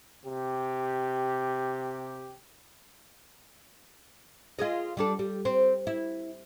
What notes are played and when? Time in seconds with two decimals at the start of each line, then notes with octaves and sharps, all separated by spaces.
0.25 C3 G4
4.59 F4 G#4 D#5
4.97 G3 D4 A4
5.19 G3
5.45 C4
5.87 E4